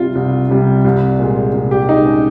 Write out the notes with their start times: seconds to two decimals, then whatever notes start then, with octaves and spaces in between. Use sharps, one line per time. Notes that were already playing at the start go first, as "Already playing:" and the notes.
Already playing: C2 C3 G3 F4
0.15 C2
0.49 C3 G3
0.85 C2
1.19 A#2 G#3
1.54 C2
1.71 G4
1.89 A#2 G#3 D#4
2.06 C#4